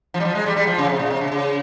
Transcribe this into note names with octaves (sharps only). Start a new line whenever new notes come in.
F3
G3
F3
G#3
G3
G3
F3
C#3
C3
A#2
C3
C#3
C#3